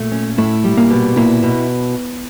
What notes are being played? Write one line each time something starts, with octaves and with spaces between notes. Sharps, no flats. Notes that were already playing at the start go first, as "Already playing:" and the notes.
Already playing: A#2 A3
C#4
A2 A3 E4
G3
A#2 A#3
B2
A#2 A#3 E4
B2